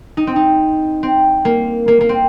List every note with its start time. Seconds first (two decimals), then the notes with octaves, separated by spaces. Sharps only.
0.17 D#4
0.27 C4
0.36 D#4
1.03 C4
1.45 A#3
1.88 A#3
2.01 A#3
2.09 C4